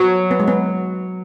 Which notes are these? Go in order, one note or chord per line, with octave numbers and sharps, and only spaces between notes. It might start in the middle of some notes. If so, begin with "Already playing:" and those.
Already playing: F#3 B3
B3
G#3
B3